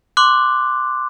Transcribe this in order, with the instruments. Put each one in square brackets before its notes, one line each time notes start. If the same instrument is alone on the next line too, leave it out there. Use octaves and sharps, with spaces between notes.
[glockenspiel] C6 D6 F#6